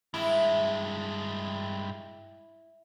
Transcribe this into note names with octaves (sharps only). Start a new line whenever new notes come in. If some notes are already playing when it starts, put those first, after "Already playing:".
G2 G#3 E4